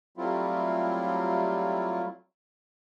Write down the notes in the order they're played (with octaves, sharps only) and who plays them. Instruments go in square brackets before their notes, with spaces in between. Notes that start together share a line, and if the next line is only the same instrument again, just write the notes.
[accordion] F#3 G3 A3 C4 E4 F4